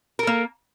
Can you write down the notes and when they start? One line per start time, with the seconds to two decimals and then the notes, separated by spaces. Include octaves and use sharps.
0.19 A#4
0.23 A4
0.27 A#3